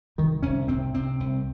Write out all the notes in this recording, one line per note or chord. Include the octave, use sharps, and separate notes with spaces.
C2 D#3
C2 C#4
C3 C4
C3 C4
C2